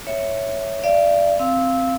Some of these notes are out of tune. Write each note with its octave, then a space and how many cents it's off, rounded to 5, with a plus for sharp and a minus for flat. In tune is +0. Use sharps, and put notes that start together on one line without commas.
C#5 +0 E5 +0
D5 +0 F5 -45
C4 +0 F5 -10 E6 -15